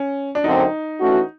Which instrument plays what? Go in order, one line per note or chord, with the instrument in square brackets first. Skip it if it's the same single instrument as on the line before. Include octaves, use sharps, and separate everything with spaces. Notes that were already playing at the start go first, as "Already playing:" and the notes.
Already playing: [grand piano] C#4
D4
[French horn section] F#2 D3 F#3 A3 C4 [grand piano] D#4
[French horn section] E3 A3 C#4 F#4